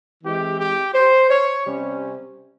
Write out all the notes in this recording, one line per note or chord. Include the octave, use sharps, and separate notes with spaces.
E3 G#3 C4 G4
G4
C5
C#5
C3 G3 C#4